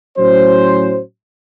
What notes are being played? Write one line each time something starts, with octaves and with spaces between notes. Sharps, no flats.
A2 F#3 C#4 F#4 C5